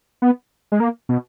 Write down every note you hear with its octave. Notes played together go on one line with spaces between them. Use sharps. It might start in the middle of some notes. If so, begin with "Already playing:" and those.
B3
G#3
A#3
B2